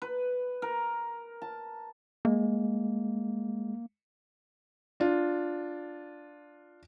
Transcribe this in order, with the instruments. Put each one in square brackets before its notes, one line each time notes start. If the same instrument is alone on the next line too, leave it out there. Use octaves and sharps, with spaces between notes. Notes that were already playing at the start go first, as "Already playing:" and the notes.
[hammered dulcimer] B4
A#4
A5
[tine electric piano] G#3 [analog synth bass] A#3
[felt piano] D4 F4